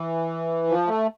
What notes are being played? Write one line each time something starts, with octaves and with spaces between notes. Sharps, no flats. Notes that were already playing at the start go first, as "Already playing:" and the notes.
Already playing: E3
F3
A3